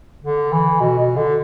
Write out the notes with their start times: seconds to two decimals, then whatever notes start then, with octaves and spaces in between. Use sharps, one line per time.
0.24 D3
0.52 E3
0.80 B2
0.98 B2
1.16 D3